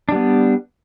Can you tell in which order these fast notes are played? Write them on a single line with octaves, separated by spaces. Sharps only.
D4 G3 B3